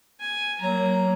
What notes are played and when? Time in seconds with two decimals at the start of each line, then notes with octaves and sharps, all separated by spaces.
0.20 G#5
0.61 F#3 A#3 A#5